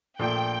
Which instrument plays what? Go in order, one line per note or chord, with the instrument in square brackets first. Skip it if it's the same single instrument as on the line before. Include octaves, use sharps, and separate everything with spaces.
[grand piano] A#1 A#2 A3 [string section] G5